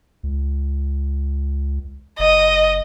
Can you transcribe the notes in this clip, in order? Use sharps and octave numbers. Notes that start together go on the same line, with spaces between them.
C#2
F#1 D#5